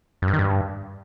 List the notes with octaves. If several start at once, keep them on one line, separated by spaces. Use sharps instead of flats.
F#2
G2
D#3
G2